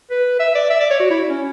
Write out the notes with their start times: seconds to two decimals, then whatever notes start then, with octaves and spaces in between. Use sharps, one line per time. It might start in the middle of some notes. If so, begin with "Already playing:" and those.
0.11 B4
0.40 E5
0.55 D5
0.70 E5
0.80 D5
0.91 C#5
1.00 F#4
1.10 E4
1.30 C#4